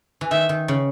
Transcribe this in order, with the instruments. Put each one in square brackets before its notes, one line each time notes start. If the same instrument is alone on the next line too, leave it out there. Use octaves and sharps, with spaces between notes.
[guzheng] E3
[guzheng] D#3 [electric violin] E5
[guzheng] D#3
C#3